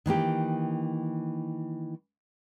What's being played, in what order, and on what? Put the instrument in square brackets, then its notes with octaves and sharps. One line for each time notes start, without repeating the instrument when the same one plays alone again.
[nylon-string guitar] D#3 E3 A#3 G4